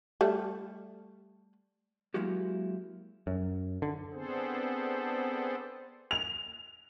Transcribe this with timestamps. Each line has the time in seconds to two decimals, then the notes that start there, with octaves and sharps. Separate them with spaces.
0.21 G3 A3
2.14 F#3 G#3 A#3 E4 F#4 G4
3.27 F#2
3.82 D3
4.13 B3 C4 D4 G#4 A4 C5
6.11 F7